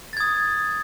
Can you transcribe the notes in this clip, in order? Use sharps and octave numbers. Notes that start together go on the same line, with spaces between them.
D#6 G#6 A6